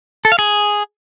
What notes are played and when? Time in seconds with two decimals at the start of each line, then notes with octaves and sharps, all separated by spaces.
0.25 A4
0.32 F5
0.39 G#4